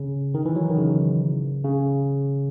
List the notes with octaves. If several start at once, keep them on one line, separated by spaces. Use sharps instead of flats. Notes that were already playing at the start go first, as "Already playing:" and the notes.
Already playing: C#3
D#3
E3
F#3
D#3
C#3
C#3